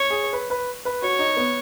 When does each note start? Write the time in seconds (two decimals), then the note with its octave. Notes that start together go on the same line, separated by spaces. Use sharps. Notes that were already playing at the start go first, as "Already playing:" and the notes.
Already playing: C#5
0.10 G#4
0.33 B4
0.50 B4
0.85 B4
1.02 F#4 C#5
1.19 D#4
1.37 B3